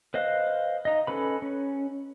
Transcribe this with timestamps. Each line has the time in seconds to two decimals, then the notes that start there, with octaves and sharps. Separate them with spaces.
0.14 B4 C5 D#5 F5 F#6
0.85 D#4 D#5
1.07 C#4 A4 B4 B5
1.42 C#4